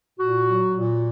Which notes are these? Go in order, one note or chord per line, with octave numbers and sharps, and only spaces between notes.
A#2 F#4
F#3
A#2